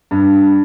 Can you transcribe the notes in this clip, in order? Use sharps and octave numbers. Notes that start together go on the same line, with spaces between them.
G2